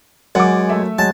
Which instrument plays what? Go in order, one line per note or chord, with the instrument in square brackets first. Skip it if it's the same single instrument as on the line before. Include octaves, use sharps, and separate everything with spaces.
[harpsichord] F#2 [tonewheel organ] G#3 [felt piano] F#5 D6
[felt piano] A3 E5
[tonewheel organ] F#3 G#3 [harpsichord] A5